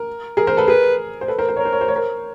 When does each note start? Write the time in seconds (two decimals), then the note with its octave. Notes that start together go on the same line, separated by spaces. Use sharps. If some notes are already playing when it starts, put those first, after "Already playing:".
Already playing: A#4
0.37 G#4 A#4
0.47 A#4 C5
0.57 A4 B4
0.68 G#4 A#4 B4
1.21 C5
1.28 A4 B4
1.38 A#4 C5
1.48 C5
1.57 A#4 C#5
1.65 C5
1.73 C#5
1.81 C5
1.88 C#5
1.96 A#4 C5